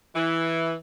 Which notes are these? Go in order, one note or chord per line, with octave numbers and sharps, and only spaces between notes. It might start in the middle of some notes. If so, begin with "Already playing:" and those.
E3